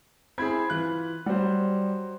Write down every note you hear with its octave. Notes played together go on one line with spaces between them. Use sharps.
C4 E4 G#4 B5 G#6
E3 F4 F#6
F#3 G3 F#4 C5